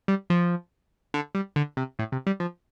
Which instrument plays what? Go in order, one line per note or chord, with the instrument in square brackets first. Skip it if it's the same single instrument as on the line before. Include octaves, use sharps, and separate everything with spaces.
[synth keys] G3
F3
D3
G3
D3
C3
A2
C3
G3
F3